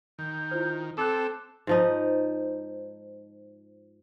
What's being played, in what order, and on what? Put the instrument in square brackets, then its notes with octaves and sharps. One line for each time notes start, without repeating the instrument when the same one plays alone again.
[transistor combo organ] D#3 [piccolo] G6
[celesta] E4 F4 C5
[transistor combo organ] C4 [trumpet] A4 [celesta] D6 F#6 [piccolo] E7
[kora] G#2 F3 D#4